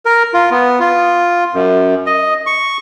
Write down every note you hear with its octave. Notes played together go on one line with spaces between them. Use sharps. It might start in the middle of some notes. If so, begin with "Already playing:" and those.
A#4
F4
B3
F4
F#2
D#5
C#6